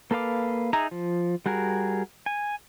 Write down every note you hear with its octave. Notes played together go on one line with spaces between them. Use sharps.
A#3 A4 B4 F5 D6
D#4 G#4 E5 A#5
F3
G3 F#4 G#4 A#4
G#5